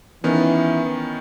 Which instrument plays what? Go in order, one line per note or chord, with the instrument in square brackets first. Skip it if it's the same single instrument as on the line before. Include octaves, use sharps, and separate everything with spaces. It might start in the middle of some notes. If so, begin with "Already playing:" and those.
[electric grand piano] D#3 B3 C#4 [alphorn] E3